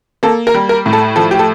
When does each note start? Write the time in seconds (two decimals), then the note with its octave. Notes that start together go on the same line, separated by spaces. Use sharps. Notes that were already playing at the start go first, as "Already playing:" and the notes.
0.23 A#3 A4
0.47 A#4
0.54 G3
0.69 A#4
0.86 A2
0.93 A4
1.16 F3 A4
1.31 G4
1.39 A4